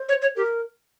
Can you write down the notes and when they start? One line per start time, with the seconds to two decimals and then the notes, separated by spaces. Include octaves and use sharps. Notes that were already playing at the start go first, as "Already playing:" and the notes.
Already playing: C5
0.09 C#5
0.22 C#5
0.36 G4 A#4